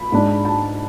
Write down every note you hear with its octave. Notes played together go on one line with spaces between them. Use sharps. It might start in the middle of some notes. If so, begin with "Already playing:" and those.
Already playing: B5
G#2 G#3 D4
A5